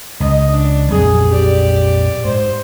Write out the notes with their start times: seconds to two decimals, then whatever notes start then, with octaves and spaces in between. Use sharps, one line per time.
0.20 C#2 D#5
0.50 D4
0.91 A#1 F2 F#3 G#4
1.29 G4 D5
2.25 G#2 C5